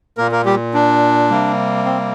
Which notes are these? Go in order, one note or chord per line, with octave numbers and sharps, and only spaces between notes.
A#2 A#3 A#4
A#3 A#4
G3 G4
D4
C3 G3 A#3
C4